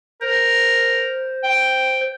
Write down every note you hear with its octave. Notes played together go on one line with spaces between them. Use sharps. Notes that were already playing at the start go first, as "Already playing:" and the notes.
A#4 C5
G5